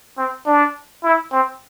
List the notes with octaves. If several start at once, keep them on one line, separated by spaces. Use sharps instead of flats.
C4
D4
E4
C4